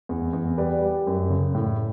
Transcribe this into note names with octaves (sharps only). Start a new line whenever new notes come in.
E2
E2
G3 B4 D5
G3
F#2
C#3
A2